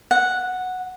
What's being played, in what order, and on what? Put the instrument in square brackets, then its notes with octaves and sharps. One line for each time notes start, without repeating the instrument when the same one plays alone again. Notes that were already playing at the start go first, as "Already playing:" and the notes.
[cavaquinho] F#5